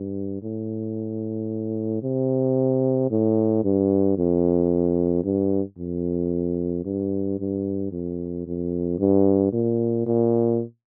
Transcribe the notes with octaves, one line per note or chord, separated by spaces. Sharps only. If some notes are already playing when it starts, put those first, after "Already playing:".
Already playing: G2
A2
C3
A2
G2
F2
G2
F2
G2
G2
F2
F2
G2
A#2
A#2